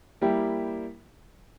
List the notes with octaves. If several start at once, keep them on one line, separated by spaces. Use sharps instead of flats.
G3 A#3 E4 G4